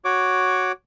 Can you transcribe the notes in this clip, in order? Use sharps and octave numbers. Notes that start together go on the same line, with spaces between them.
F#4 C#5 D6